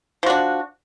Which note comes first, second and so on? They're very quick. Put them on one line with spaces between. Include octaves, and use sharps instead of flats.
F3 F#4 D4